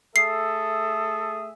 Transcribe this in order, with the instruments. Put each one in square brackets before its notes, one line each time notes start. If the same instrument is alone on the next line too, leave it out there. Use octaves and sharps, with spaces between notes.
[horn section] A3 G#4 E5 [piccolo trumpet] A4 [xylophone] C7